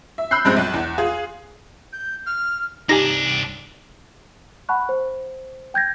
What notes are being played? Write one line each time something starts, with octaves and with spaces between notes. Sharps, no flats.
E5
B5 E6 F#6 G6 C7
A#1 G2 G#3 C4 F#6
B1
E2
F4 G#4
G6
F6
C2 D4 D#4 G4 G#5 A#6
F#5 A5 B5 C#6 F#6
C5
G5 G6 G#6 A#6